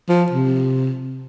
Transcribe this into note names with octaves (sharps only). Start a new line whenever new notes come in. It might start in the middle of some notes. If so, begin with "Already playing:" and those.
F3
C3